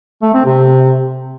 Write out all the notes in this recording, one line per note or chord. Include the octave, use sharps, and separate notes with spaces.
A3
C4
C3